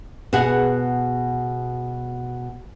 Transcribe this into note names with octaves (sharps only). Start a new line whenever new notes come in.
B2 F#4 G#4 F#5